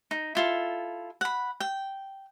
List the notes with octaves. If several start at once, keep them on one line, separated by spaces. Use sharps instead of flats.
D#4
E4 F4 A4
F#5 B5
G5